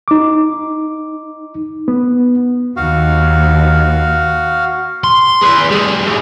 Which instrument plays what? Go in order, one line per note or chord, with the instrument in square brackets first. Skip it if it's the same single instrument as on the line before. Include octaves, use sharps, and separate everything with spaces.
[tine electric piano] D#4 D6
[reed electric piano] B3
[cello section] D#2 [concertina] F#4 F5
[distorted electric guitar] C6
G#4 B4
G3 G#4
A3 G4